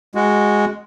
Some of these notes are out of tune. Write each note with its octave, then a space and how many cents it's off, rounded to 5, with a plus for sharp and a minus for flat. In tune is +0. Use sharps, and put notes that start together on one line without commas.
G#3 +0 F#4 +0